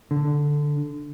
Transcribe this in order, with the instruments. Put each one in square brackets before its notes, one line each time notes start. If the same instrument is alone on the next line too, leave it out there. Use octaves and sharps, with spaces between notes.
[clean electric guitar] D3